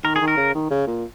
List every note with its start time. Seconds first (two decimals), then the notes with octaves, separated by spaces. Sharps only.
0.04 D#3 A#4
0.16 G#4
0.21 D#3
0.28 A#4
0.37 C#3
0.55 D#3
0.70 C#3
0.87 A#2